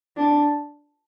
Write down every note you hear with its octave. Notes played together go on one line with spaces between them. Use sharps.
D4